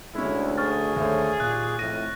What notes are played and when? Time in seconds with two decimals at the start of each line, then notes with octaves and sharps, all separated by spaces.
0.15 D2 G#3 C#4 E4
0.57 G#4 C#6 F6 A6
0.96 D#2 D3 A3 C5 C#5
1.40 D#2 A#2 F#6
1.79 F2 A2 A#6 D#7